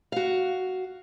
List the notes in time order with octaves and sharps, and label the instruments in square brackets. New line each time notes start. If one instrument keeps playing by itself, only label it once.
[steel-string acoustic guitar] F#4 F5